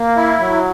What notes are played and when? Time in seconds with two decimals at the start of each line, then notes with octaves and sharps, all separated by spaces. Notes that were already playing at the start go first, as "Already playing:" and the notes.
Already playing: A#3
0.17 E4
0.40 F#3